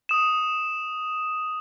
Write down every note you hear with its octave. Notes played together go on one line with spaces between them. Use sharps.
D#6 E7